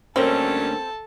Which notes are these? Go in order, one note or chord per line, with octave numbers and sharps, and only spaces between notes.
D2 F#3 G3 A#3 C4 C#4 A4 A5